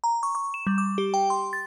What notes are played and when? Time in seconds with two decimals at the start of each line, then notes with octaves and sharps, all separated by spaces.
0.04 A#5
0.23 C#6
0.35 C#6
0.54 E7
0.67 G3
0.78 D6
0.98 G4
1.14 G5
1.30 C6
1.53 A6